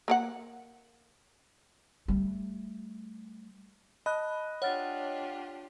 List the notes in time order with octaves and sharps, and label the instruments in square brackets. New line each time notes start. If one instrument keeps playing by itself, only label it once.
[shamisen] A#3 A#4 F#5
[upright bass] G3 A3
[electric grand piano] D#5 [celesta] A5 [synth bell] B5 F#6
[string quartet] D4 F4 G4 [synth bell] C#5 [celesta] F#5 F6 A6